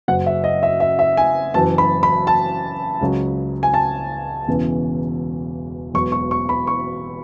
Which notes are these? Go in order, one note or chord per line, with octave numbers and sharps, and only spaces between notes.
F#1 F#2 C#3 F#3 F#5
E5
D#5
E5
E5
E5
G#5
F#1 F#2 E3 A5
B5
B5
A5
C#2 C#3 F#3
G#5
A5
E1 E2 C#3 E3
E1 E2 B2 F#3 C#6
C#6
C#6
B5
C#6